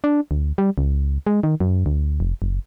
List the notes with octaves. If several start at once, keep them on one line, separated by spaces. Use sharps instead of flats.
D4
D2
G3
C#2
G#3
D#3
F#2
D2
F1
F#1